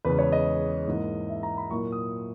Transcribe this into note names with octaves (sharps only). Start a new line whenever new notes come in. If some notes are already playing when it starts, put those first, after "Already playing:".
E2 C#3 G#3 B4
C#5
D#5
G#2 E3 A#3
E5
A#5
B5
A#2 F#3 A#3 E4 C#6
D#6